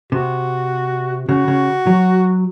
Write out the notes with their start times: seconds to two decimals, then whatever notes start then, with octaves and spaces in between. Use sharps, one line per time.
0.12 C3 F#4
1.28 C#3 F#4
1.48 C#3
1.87 F#3